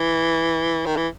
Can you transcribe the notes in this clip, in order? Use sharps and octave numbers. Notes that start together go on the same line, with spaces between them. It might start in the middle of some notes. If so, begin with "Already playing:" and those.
Already playing: E3
D#3
E3